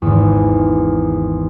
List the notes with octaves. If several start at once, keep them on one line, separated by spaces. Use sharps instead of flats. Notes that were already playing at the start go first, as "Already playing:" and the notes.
G#1 E2